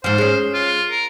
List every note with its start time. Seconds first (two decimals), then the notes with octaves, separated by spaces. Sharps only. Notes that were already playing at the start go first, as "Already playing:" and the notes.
0.04 G#2 F3 C5
0.18 G#3 C#4
0.54 F4
0.91 A#4